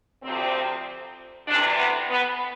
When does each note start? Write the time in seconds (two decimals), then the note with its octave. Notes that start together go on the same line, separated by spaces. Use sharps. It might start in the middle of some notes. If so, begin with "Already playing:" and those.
0.23 D2 C3 F3 C4
1.48 D2 C3 E3 D4
1.79 B3
2.10 B3